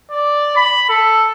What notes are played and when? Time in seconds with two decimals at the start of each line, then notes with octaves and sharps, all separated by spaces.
0.11 D5
0.56 B5
0.89 A4